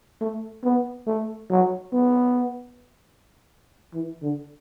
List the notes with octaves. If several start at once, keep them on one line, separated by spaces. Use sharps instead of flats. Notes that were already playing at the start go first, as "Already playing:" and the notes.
A3
B3
A3
F#3
B3
E3
D3